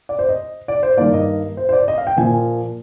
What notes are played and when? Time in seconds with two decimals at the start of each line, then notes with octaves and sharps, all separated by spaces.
0.09 D5
0.19 C5
0.29 D#5
0.68 D5
0.83 C5
0.97 G2 D#3 A#3 D5
1.13 D#5
1.57 C5
1.69 C5
1.73 D5
1.88 D#5
1.98 F5
2.07 G5
2.17 A#2 F3 A#3 G#5